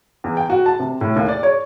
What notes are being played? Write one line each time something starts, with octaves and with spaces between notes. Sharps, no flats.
E2
G5
F#4
A5
C3
A2
D#2
D5
C#5